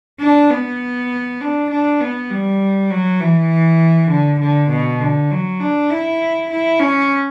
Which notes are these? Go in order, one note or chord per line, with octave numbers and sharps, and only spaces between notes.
D4
B3
D4
D4
B3
G3
F#3
E3
D3
D3
B2
D3
F#3
D4
E4
E4
C#4